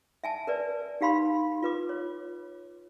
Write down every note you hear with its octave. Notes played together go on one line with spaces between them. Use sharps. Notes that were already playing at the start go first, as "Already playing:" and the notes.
E5 G#5 A5
A#4 B4 D5
D#4 G4 F5 B5 C6
F4 B4 D6
C#5